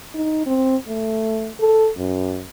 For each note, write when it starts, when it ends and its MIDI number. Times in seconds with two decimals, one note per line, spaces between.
0.14 0.46 63
0.46 0.76 60
0.88 1.51 57
1.60 1.89 69
1.97 2.43 42